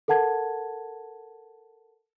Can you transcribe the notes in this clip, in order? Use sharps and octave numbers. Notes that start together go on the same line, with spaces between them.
A4 A#4 F#5 A5 G#6